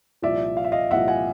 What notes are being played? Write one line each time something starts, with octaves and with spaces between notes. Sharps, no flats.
C2 A#2 F3 D5 E5
F5
E5
D#5 F5
C2 A#2 F3 E5 F#5
F#5 G#5